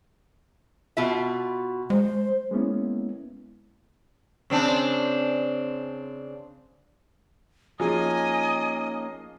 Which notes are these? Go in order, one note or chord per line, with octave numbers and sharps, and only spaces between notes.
B2 F4 E5
G#3 C5
G#3 A#3 B3 C#4 E4
C#3 C4 D4
F3 A#3 C#4 D#4 G#4 D#5 G#5